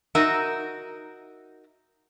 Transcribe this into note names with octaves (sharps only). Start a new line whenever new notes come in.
D#4 F#4 A#4 E5